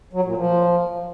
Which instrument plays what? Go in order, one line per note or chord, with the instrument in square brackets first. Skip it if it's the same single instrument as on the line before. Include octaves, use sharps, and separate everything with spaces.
[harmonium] F#3
A#2
F3